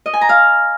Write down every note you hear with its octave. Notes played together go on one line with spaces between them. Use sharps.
D#5
G#5
A#5
F5